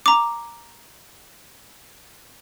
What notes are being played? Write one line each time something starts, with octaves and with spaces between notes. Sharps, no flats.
A#5 D6